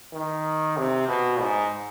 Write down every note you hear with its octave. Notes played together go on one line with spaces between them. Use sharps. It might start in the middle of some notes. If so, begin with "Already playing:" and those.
D#3
C3
B2
G#2